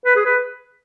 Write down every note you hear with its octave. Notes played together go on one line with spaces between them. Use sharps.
B4
G#4
B4